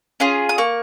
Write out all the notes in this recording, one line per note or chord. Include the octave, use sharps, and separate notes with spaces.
C#4 F4 G#4
D#6
A#3 C#6